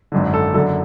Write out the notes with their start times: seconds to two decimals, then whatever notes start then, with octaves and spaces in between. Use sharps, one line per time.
0.12 G#1 F#2 D3
0.34 A4
0.54 F#1 F#2 D3 A4